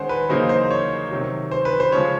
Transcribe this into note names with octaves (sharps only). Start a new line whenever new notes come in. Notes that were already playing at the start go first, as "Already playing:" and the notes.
Already playing: D#3 G#3 C#4 C5 F#5
B4
E2 C#3 F#3 A#3 D#4 C5
C5
C#5
C3 D#3 F#3
C5
B4
C5
C#3 F3 G#3 C#4 C#5